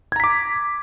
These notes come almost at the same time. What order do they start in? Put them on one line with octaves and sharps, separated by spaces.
G#6 A#5 B6 D6